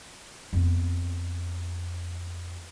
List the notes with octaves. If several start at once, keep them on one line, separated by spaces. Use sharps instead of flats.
F2 B3